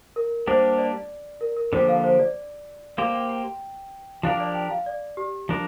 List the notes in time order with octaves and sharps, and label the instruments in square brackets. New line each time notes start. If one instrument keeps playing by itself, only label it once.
[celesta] A#4
[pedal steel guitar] G3 A#3 D4 G4 [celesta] C5
[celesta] D5
A#4
A#4
[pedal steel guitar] D3 F3 A#3 G4 [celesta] C5
[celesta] F5
C5
D5
[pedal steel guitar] A#3 G4 C5 [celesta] F5
[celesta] G5
G5
[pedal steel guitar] F3 D4 G4 A#4 [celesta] F5
[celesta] D5
G5
F5
D5
G4
[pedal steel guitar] F3 D4 A#4